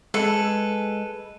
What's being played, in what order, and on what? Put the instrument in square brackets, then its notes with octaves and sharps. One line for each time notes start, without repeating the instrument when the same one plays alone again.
[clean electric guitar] G#3 [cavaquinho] A4 B4